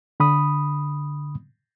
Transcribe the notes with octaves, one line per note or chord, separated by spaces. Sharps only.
D3 B5 D#6